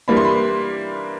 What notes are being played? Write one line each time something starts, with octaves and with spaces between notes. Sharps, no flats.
E3 G3 A#3 D4 B5
C6
B5